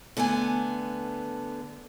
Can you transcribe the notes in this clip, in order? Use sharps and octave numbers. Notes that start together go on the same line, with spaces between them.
D3 A3 B3 G#5